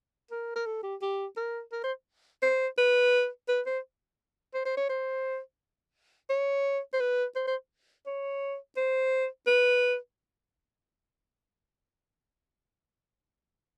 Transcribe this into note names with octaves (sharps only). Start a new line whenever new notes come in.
A#4
A#4
A4
G4
G4
A#4
A#4
C5
C5
B4
B4
C5
C5
C5
C#5
C5
C#5
C5
B4
C5
C5
C#5
C5
B4